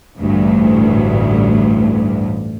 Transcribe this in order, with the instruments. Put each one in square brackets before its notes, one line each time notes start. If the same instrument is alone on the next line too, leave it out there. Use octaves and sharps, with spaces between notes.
[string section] A1 D2 G2